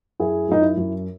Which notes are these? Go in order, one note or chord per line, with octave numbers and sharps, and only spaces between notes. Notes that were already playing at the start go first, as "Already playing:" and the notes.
F#2 E4 G#4
F#2 D#4
E4
F#2